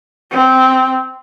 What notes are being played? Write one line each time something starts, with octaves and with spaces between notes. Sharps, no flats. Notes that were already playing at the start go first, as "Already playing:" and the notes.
C4